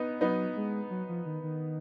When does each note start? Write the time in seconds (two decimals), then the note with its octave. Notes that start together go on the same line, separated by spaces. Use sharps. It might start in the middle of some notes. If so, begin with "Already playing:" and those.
Already playing: B3 D#4
0.21 F#3 B3 D#4
0.57 G#3
0.90 F#3
1.09 F3
1.26 D#3
1.43 D#3